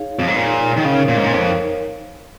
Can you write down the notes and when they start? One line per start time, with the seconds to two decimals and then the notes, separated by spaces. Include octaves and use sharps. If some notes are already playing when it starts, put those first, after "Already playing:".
Already playing: D#4 G#4 C#5 F5
0.19 F2
0.28 G#2
0.36 A#2 D#4 G#4 C#5 F5
0.77 D#3
0.85 C#3 D#4 A#4 C#5 F5
1.09 A#2
1.17 G#2
1.24 A#2
1.33 F2 D#4 A#4 C#5 F5